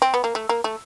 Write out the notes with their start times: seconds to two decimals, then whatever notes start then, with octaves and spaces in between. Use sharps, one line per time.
0.02 C4
0.14 B3
0.24 A#3
0.35 A3
0.49 A#3
0.64 A3